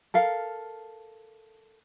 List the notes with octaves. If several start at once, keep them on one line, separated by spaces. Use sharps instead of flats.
A4 A#4 F5